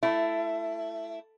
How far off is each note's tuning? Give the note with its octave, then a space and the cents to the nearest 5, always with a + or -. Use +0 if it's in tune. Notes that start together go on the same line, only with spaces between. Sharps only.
A3 +0 E4 +20